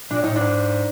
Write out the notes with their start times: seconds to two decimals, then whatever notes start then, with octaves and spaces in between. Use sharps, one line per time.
0.11 A#2 D4
0.21 A2
0.24 D#4
0.31 A2
0.36 G#2 D4